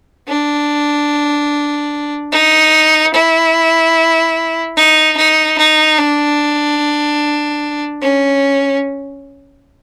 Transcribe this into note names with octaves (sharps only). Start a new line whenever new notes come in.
D4
D#4
E4
D#4
D#4
D#4
D4
C#4